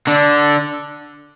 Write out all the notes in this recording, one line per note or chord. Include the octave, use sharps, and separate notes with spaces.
D3 D4